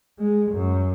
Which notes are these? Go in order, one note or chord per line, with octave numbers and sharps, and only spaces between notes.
G#3
F#2